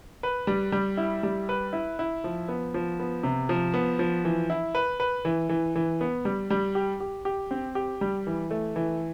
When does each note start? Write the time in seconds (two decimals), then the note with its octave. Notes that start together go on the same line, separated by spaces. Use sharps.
0.23 B4
0.47 G3
0.72 G3
0.97 E4
1.23 G3
1.49 B4
1.73 E4
1.99 E4
2.24 F3
2.48 B3
2.74 F3
2.99 B3
3.23 C3
3.49 F3
3.74 B3
3.99 F3
4.25 E3
4.50 E4
4.75 B4
5.00 B4
5.25 E3
5.49 E3
5.75 E3
6.01 B3
6.25 G3
6.50 G3
6.75 G4
7.00 G4
7.25 G4
7.51 C4
7.75 G4
8.01 G3
8.27 E3
8.51 A3
8.76 E3